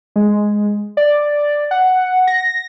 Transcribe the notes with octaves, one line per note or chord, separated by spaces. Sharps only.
G#3
D5
F#5
A#6